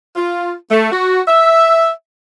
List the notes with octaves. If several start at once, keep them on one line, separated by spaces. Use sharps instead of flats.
F4
A3
F#4
E5